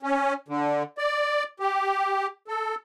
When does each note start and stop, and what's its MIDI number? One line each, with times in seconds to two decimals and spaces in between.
0.03 0.33 61
0.48 0.83 50
0.98 1.43 74
1.60 2.26 67
2.48 2.75 69